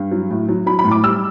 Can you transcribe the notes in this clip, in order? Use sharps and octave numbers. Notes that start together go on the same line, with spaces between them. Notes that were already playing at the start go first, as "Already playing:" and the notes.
Already playing: G2
F#3
A2
F#3
F#3 B5
B5
A2
D6
G3 E6